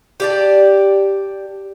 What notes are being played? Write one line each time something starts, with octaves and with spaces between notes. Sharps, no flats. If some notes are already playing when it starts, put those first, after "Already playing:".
G4 D5 A5